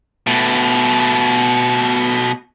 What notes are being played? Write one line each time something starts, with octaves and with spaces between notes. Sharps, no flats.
B2 A3